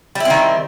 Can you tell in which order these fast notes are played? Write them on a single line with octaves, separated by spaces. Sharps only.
G3 E4 C4 D#3